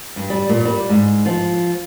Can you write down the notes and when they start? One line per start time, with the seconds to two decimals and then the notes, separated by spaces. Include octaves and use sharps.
0.16 G2
0.30 G3
0.49 A#2
0.65 G3
0.89 G#2
1.26 F3